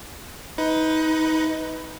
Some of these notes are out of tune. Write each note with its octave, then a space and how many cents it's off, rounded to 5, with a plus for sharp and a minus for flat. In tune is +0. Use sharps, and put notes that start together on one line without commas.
D#4 +25 B4 +10